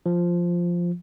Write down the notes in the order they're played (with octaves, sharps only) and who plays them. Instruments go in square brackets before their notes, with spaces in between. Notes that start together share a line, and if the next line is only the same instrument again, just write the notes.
[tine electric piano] F3